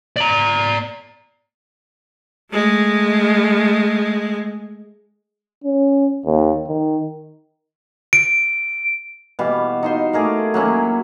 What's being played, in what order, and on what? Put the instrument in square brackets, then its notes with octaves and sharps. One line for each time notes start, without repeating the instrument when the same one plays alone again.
[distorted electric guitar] D5 A#5
[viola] G#3 A3
[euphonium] C#4
D#2
D#3
[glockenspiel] D7
[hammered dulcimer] B2 E3 G3 F5
D#4 C5 C6
A3 G#4 A#4 D5
F#3 A#3 C#4 E4